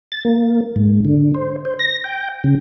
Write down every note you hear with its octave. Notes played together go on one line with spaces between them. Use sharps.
A6
A#3
G#2
D3
C5
C5
A#6
G5
C#3